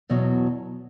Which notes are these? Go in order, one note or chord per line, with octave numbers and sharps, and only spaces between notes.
E2 B2 F#3